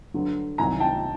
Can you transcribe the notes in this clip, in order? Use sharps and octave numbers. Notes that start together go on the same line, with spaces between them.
G2 D3 F#3
C2 C3 D#3 F#3 G#5 A#5
G5 A5